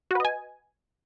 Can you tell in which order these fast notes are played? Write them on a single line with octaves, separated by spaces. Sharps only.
F#4 B4 D#5 G#5